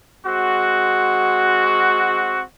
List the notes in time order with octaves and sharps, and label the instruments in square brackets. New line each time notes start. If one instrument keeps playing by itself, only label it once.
[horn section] G#3 C4 F#4